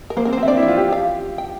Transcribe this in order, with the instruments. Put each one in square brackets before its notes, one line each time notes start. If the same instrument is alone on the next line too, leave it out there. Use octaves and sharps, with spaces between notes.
[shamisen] A#4
[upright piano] A#3 [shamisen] C5
[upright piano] C4 [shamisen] A#4
[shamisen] C5
[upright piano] C4
[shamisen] E5
[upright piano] D4 [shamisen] D5
[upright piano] E4
[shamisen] E5
[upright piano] F4
G4
G4
[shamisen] F5
G5